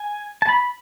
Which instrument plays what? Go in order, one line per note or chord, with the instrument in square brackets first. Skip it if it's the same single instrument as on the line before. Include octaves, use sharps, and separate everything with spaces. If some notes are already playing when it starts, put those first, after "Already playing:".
Already playing: [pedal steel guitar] G#5
A5
B5